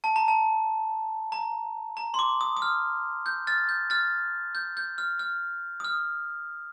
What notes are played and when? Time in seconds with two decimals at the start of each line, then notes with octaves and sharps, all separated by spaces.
0.04 A5
0.16 A#5
0.28 A5
1.32 A#5
1.97 A#5
2.14 C6
2.19 D6
2.41 D#6
2.57 D#6
2.62 F6
3.26 G6
3.47 F6 A6
3.69 G6
3.90 F6 A6
4.55 G6
4.77 G6
4.98 F6
5.19 F6
5.80 D#6
5.85 F6